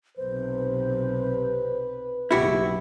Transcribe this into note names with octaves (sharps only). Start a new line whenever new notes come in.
B1 C3 B4 C5
F#1 B1 C#3 E4 F#4 G4 E5